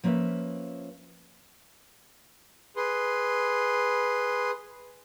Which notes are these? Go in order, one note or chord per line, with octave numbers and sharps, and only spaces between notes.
F3 A#3 C#4 B4 E5
G#4 B4 C6